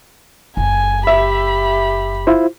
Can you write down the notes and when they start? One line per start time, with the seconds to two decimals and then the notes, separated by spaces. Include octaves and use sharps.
0.57 F#1 G#5
1.07 G4 E5 B5
2.27 E4 F4 C5